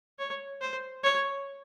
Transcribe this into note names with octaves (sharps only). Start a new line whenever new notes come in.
C#5
C5
C#5